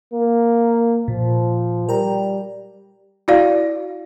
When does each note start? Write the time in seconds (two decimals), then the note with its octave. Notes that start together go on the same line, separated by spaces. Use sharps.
0.14 A#3
1.08 A#2 F3
1.89 G3 A#4 G5 A#5
3.28 E4 F#4 D5 F5